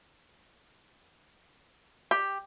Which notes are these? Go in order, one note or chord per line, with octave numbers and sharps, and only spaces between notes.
G4